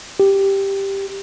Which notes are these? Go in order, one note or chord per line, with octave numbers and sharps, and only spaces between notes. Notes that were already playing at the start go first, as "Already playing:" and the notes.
G4